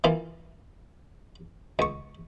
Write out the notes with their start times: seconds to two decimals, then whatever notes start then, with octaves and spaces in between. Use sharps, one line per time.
0.04 E3 A#3 F4 F5
1.79 C#2 C#6